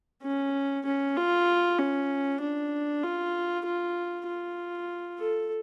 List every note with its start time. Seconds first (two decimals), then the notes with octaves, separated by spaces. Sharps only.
0.23 C#4
0.86 C#4
1.17 F4
1.79 C#4
2.40 D4
3.03 F4
3.65 F4
4.27 F4
5.20 A4